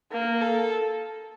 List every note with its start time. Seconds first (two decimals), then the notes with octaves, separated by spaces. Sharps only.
0.12 A#3
0.41 A4